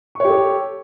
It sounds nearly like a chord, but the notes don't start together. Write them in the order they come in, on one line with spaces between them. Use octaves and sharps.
C#6 C#5 G4 A4